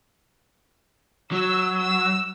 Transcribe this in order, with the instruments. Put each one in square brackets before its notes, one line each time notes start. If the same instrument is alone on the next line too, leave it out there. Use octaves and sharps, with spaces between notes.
[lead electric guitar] F#3 [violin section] E6
[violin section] E6